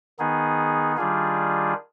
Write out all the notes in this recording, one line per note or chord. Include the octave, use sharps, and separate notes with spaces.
D#3 B3 D#4 G#4
D#3 G3 D4 F4 G#4